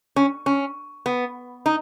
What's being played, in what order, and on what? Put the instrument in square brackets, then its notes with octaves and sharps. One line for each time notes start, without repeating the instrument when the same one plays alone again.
[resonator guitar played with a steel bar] C#4
C#4
B3
D#4